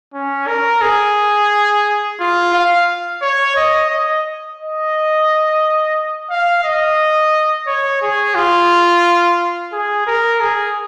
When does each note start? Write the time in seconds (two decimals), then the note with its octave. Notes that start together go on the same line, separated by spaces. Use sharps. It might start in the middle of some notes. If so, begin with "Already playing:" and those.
0.14 C#4
0.48 A#4
0.82 G#4
2.20 F4
2.54 F5
3.22 C#5
3.56 D#5
3.91 D#5
4.59 D#5
6.30 F5
6.64 D#5
7.67 C#5
8.02 G#4
8.35 F4
9.73 G#4
10.07 A#4
10.41 G#4